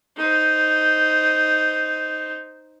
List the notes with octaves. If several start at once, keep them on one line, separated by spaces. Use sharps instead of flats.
D#4 C5